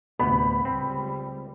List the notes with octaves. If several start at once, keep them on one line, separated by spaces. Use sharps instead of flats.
D2 A2 C3 B3 B5
C#2 G3 C4